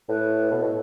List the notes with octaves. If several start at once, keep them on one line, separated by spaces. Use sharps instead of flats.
A2 B4
B4
B2 A4
A2